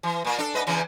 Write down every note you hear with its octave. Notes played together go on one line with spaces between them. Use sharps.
E3
A#2 A#3
D4 A4
G#2 B4 D#5
E2 C#3 E3